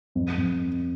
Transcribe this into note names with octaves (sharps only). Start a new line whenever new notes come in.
F2
F2